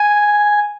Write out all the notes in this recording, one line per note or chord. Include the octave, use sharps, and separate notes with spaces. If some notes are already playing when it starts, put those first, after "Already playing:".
Already playing: G#5